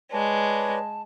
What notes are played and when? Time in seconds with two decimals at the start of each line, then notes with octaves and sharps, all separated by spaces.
0.12 G#3 B4 C#5 D5 A5